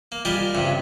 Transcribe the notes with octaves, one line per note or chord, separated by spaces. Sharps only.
A#3
G3 G#3 F4 G4 A#4
C#2 G2 C3